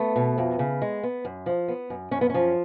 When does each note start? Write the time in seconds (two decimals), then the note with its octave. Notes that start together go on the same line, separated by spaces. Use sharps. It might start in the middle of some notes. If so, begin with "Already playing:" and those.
Already playing: A3 B3
0.16 B2
0.38 F2
0.59 C#3
0.82 G#3
1.03 B3
1.25 F#2
1.46 F3
1.68 B3
1.90 F#2
2.11 F#2 C#4
2.21 B3
2.30 F3 C#4